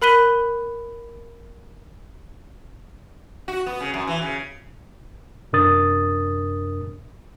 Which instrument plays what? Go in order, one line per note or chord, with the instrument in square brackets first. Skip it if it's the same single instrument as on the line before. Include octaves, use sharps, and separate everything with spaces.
[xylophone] A#4 B5 F#6 B6 D#7 G7
[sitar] F#4
B3
C#3
F#2
E3
C#3
[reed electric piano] F#2 C3 D4 A#4 D#6 A6